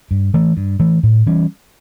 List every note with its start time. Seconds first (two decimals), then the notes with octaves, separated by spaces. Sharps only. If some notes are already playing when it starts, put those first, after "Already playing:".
0.11 G2
0.34 E3 A3
0.57 G2
0.79 E3 A3
1.03 A2
1.26 E3 G3 C#4